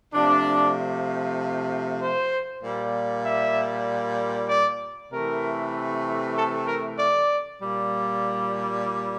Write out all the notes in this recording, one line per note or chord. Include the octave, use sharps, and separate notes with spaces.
C3 F3 A3 D4
C5
A#2 G3
E5
D5
C3 E3 A3 A#4
A4
A#4
D5
A#2 G3